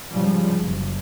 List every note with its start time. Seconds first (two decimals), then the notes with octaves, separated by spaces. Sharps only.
0.12 G#2 C#3 F3 G3
0.62 F#1